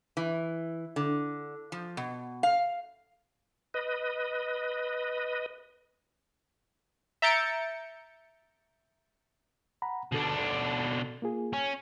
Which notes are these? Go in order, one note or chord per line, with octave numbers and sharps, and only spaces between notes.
E3
D3
F3
B2
F5
B4 D#5
E5 A#5 G6 A6 C#7 D7
F#5 A#5 B5
B2 D3 D4 A4
A4
A#3 F4 G#4
C#4 G#5